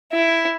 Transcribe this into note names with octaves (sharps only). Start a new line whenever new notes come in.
E4